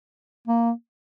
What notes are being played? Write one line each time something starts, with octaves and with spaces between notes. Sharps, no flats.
A#3